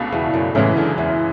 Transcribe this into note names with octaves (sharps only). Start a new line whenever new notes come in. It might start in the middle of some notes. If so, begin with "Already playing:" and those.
Already playing: C#2 B2 A3 D4
E2
F#2
F#2 A2 C#3 E3 G#3
D3
E2